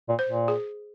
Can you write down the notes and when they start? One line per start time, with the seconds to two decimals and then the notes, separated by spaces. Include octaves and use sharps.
0.09 A#2
0.19 C5
0.28 A#2
0.48 G#4